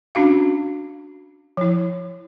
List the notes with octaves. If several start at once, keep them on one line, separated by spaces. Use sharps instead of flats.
C#4 D4 F#4 F5
F3 E4